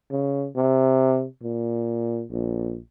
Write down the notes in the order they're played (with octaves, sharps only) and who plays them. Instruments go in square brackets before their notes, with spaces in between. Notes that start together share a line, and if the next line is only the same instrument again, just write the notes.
[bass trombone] C#3
C3
A#2
A#1